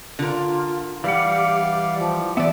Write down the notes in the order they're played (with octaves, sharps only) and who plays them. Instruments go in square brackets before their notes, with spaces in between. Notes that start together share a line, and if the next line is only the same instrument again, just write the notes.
[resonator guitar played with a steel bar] D3 A#4 [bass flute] F4
[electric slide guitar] E3 G3 F#5 [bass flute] G4 [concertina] D5 F5
[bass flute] F3 [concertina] G4
[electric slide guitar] E3 B3 [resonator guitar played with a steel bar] D5 E5